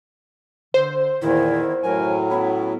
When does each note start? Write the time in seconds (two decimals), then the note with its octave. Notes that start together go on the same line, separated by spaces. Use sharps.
0.74 D3 C5
1.22 E2 A#2 D#3 E4
1.84 F#2 A2 F#3 A#4 G#5
2.30 B3 C#4 E4